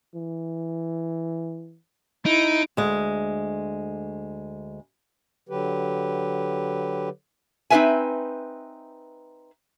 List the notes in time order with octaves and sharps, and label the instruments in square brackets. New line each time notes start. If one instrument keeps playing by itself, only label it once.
[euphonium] E3
[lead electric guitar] D#4 [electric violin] E4 D7
[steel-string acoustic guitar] D2 G#3
[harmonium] D3 F#3 G4 B4
[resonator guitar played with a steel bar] C4 D#4 G4 B4 E5 G#5